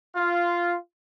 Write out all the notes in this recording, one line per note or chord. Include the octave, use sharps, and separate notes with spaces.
F4